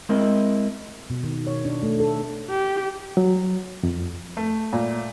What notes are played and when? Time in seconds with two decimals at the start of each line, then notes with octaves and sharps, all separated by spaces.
0.09 G#3 C4 E4 A#4 D#5
1.10 B2
1.24 D#3
1.47 C#5
1.65 D4
1.83 A3
2.00 A4
2.50 G4
3.17 F#3
3.83 F2
4.37 A3
4.73 A#2